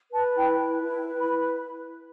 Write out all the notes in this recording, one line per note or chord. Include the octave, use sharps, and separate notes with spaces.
B4 A5
E4 G5
B4
E4
B4
B5